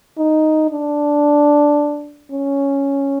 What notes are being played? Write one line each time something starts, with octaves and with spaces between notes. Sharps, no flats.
D#4
D4
C#4